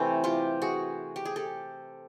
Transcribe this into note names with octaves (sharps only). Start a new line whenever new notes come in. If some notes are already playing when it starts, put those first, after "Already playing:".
Already playing: C3 E3 A3 C4
F4 G4
F#4 G#4
G4
G#4
G4 A4